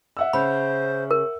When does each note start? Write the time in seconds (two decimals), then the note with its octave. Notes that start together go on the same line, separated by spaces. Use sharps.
0.17 E5 F#5 E6
0.33 C#3 C5 B5
1.11 A#4